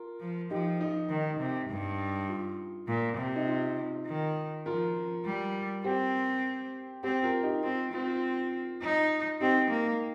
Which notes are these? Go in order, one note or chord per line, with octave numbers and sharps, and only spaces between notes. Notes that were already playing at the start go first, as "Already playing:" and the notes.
Already playing: F4 A#4
F3
F3 D#4 G4
D#4
D#3
C3
G2
F4
A#2
C3
D#4
F4
D#3
F3 F4 A#4
G3
C4 G4 C5
C4 G4 C5
F4 A#4
D#4 G4
C4 F4
C4 F4
F4
D#4
C4 D#4 G4
A#3